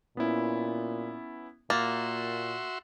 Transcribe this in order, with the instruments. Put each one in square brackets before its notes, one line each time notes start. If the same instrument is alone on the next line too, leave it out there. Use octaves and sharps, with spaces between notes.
[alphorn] A#2 [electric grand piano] B3 C#4 E4
[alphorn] A#2 [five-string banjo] A#3 [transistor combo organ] F#4 E5 C6 [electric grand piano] A6